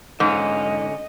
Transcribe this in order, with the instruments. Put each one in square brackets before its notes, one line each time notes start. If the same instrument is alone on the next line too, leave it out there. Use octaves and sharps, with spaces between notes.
[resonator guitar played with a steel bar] G#2 [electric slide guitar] D3 C#4 F4 [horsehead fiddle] D#5